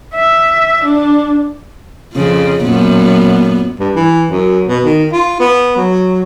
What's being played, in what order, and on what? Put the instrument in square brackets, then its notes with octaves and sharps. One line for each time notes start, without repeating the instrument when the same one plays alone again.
[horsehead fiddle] E5
D4
[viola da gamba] F2 C#3 F3
F#2 A#2 B3
[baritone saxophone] G2
E3
F#2
B2
D#3
F4
B3
F#3